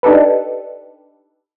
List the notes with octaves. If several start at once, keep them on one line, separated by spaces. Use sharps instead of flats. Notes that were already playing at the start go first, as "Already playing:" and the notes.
D4 D#4 G4 A4 B4